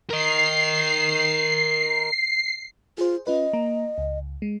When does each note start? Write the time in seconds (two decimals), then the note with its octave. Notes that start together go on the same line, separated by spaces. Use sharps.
0.10 A#4 D#5 C7
2.98 F4 G#4 C5
3.27 C#4 F4 B4 D#5
3.53 A#3 A#5
3.98 C#2
4.42 G#3